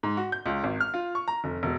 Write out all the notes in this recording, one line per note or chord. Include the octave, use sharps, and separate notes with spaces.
G#2
F#4
G6
C#2
G#1
F6
F4
C#6
A#5
F1
E1